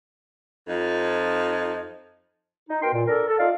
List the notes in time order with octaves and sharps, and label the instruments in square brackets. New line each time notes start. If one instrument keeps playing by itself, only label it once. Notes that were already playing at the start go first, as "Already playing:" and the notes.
[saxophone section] F2 F3 D#4
[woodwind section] D#4
B2 A#4 G5 C6
A#2
D4 A4 A#4
A4
D#4 F4 D5 F5